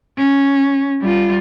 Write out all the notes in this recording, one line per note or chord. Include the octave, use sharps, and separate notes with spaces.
C#4
G3 F4